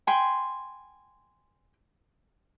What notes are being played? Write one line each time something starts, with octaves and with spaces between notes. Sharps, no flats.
G5 G#5 B5 C6